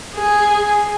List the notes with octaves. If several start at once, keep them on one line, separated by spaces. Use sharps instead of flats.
G#4